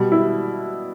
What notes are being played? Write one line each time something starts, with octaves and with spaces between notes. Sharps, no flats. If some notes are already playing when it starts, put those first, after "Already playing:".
Already playing: B2 G3
E4